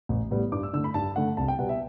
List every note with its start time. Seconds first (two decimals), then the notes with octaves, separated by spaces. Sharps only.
0.09 A1
0.31 A2 G3 B3
0.52 G2 D6
0.63 E6
0.73 D3 E6
0.77 A3
0.84 B5
0.94 G2 A5
1.16 D3 A3 F#5
1.37 C2 A5
1.48 G5
1.59 B2 G3 B3 F#5
1.69 E5